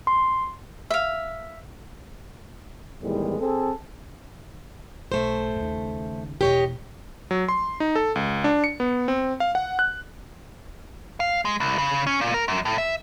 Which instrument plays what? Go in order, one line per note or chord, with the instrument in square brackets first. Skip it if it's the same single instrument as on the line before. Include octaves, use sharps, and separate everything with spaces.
[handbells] C6
[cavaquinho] E5 F5
[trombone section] E2 A2 D#3 G3 G#3
C4 G#4 A4
[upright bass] B1 [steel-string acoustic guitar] A3 C5
[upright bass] D#2 C#3
[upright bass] E1 [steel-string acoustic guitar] G4 C#5 D#5
[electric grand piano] F#3
C6
D#4
A4
C#2
D4
C#7
B3
C4
F5
F#5
F#6
[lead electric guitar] F5
G#3
C2
C#3
C#4
A#2
A#4
F#2
A2
E5